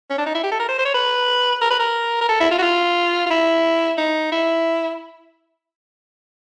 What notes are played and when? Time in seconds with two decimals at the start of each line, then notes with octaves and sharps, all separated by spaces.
0.10 C#4
0.18 D4
0.26 D#4
0.35 E4
0.43 G4
0.52 A4
0.60 A#4
0.68 C5
0.78 C5
0.85 C#5
0.94 B4
1.61 A#4
1.70 B4
1.79 A#4
2.21 A#4
2.29 A4
2.40 E4
2.51 F4
2.58 F#4
2.62 F4
3.26 F4
3.30 E4
3.97 D#4
4.32 E4